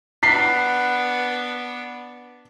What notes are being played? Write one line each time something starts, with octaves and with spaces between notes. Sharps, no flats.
B3 D4 B6 C7